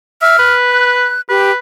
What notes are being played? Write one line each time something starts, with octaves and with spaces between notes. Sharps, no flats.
E5 F6
B4
F#6
G4 B4